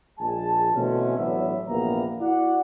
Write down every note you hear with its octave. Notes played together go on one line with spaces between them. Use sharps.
A#1 G#3 G#5 A5
B2 D3 E3 A3 C4 C#4
A1 A2 D3 F#3 B3 E5
A#1 E2 C3 A#3 B3 A#5
E4 F#4 D5 F#5